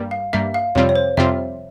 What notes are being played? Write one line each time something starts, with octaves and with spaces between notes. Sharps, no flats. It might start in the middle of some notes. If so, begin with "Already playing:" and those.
Already playing: G2 G3 A#3
F5
G2 G3 A#3 E5
F5
F2 C3 G3 C4 F4 C#5
C#5
C5
F2 C3 G3 C4 F4 E5